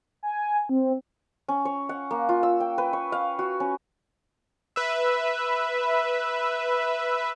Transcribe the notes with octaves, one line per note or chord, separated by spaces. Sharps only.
G#5
C4
C#4
C#5
F#5
A#3
F4
E6
G5
B4
C#6
F5
F#4
C#4
B4 E5